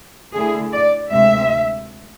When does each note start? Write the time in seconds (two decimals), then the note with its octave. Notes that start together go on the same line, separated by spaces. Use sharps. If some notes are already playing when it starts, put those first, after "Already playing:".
0.34 D3 A3 E4 G#4
0.72 D5
1.10 D2 C3 G#3 E5